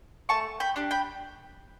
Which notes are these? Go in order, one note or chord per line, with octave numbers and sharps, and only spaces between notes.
A3 A5 C#6
G5 B5
D4 G4
G5 B5